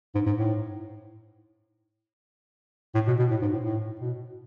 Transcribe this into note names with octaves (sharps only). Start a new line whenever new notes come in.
G#2
G#2
A2
A2
B2
B2
A2
G#2
A2
A2
B2